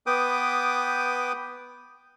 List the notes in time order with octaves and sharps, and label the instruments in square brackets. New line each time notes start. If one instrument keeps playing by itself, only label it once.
[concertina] B3 B4 G5 D6 D#6